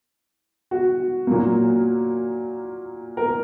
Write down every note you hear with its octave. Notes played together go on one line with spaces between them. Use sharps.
F#4
A#2 F#3 A#3
A#4